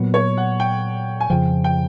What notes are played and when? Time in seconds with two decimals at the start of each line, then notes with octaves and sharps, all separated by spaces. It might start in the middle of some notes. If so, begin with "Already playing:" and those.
Already playing: A#2 F#3 B3
0.14 C#5
0.37 F#5
0.60 G5
1.20 G#5
1.30 F2 C#3 F3 G5
1.64 G5